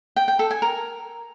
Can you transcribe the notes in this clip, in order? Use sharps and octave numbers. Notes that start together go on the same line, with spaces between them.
G5
G5
A4
G#5
A#4